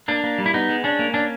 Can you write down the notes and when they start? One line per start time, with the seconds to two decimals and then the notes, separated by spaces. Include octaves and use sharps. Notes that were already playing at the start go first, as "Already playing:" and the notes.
0.08 A#3 D4
0.24 A#3
0.38 G3
0.46 E4
0.54 B3 D#4
0.69 G#3
0.84 C#4 D4
0.99 A#3
1.14 C#4 D4